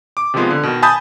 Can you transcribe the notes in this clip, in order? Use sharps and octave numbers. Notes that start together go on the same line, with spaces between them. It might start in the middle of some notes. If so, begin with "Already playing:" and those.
D6
C3 D#3 F3 G#3 B3 F4
D3
B2 D#3
G#5 A5 B5 D#6 G6